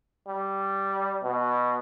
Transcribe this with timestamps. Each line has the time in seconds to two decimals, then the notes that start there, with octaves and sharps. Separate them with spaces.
0.28 G3
1.23 B2